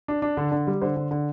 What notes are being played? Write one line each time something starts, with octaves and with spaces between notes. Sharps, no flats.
D4
D4
D3
D3
G3
D3 C5
D3
D3